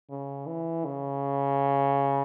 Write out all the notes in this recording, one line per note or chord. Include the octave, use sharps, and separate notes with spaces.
C#3
E3
C#3